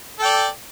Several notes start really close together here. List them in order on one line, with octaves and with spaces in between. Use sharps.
A4 G5 D5